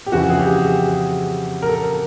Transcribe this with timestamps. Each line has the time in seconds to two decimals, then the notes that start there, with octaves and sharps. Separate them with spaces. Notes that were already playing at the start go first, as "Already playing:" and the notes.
0.06 G4
0.12 F2 C#3 E3 F#4
0.30 G#4
0.38 G4
0.65 G#4
1.62 A#4
1.69 A4